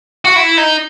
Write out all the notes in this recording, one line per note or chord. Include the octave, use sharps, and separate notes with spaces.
F#4
E4
D#4